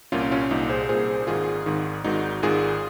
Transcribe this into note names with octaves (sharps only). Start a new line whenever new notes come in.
C2 A#2 C#4 F4
C#4 F4
C2 A#2 D#4
G#4 C5
C2 A#2 G#4 C5
G#1 G#2 D#3 F4 G#4
G#1 G#2 D#3
G#1 G#2 D#3 D#4 F#4
G#1 G#2 D#3 F4 G#4